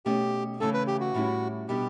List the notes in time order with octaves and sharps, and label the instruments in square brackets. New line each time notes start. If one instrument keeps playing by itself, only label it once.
[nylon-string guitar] B2 A3 C#4 [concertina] G4
[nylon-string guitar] C#3 E3 A3 C#4 [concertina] A4
[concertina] B4
G4
F#4
[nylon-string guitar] A2 G3 C#4 E4
[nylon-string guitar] B2 G3 B3 D4 [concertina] G4